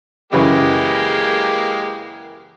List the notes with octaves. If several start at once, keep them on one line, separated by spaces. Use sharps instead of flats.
F#2 C#3 E3 G#3 A#3 G4